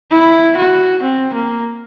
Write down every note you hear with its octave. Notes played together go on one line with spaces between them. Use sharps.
E4
F#4
C4
A#3